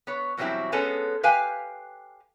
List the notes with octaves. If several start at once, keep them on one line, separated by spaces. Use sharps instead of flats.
B3 C#5
E2 B2 F#3 G3 C4 E4
G#3 B3 C#4 A4
G4 B4 F5 G5 G#5